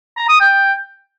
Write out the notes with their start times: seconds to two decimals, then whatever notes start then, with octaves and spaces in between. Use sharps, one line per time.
0.17 A#5
0.29 D#6
0.40 G5